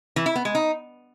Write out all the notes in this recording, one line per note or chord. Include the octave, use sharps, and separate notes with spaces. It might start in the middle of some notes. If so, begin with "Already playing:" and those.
E3
E4
B3
G#3
D#4